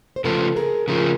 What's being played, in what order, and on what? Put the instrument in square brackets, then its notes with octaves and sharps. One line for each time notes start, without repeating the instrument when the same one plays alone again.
[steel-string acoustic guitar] C5
[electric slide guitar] C#3 F3 A3 [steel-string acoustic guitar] A4 B4
[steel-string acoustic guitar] G#4 A#4
[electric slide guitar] C#3 F3 A3 [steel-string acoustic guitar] G#4 A#4